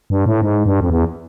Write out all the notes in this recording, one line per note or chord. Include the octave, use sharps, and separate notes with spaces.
G2
A2
G#2
G2
F2
E2